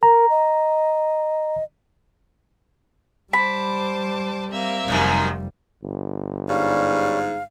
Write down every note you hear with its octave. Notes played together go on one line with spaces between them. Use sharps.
A#4 A#5
D#5
G3 C5 A5 B5 D6
A#3 C4 E5
F1 F#2 C3 D#3 G3
G1
G#2 G3 C#4 F5